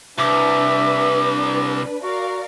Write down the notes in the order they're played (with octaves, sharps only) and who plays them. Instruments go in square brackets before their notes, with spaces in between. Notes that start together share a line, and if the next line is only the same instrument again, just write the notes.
[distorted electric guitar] C2 [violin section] D4 B4 [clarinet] E5 [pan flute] D6
[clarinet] F#4 [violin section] A#4 D5 F5